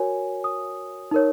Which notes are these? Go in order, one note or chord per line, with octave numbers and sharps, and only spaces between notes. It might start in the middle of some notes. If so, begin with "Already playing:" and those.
Already playing: F#4 A#4 C#5 G#5
D#6
D#4 A#4 C#5